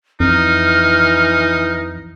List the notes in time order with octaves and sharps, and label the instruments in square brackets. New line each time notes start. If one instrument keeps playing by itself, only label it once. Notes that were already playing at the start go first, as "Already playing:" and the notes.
[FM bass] F2 [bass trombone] E3 [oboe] D#4 [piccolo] F6